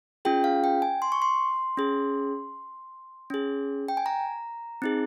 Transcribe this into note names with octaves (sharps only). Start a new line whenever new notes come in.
C#4 F4 G#4 G5
F5
G5
G#5
C6
C#6
C6
C#4 G#4
C#4 G#4
G5
G#5
A#5
C4 D#4 G#4